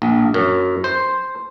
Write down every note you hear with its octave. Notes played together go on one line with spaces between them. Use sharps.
A#1
F#2
C5